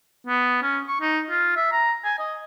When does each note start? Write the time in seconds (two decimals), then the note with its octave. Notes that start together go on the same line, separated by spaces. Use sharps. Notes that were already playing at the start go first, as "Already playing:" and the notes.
0.27 B3
0.62 C#4
0.88 C#6
1.01 D#4
1.30 F4
1.56 E5
1.72 A#5
2.04 G#5
2.19 D#5